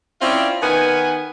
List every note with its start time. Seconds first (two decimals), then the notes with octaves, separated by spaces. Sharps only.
0.21 C4 C#4 E4 F4 D5 E5
0.62 D#3 B3 G#5